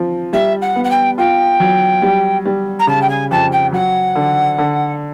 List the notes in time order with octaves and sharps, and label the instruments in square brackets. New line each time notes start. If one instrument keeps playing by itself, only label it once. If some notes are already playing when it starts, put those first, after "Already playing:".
Already playing: [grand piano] F3 C4
[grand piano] G3 [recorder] E5
[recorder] F#5
[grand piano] B3
[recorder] F#5
G5
[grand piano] F4 [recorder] G5
[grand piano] F#3
G3
G3
[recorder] A#5
[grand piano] C#3 [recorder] A5
[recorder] G5
G#5
[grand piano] F2 [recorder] A5
[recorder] G5
[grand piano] F#3 [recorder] F#5
[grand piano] D3
D3